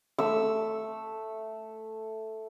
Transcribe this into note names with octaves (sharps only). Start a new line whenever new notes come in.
A3 E5 E6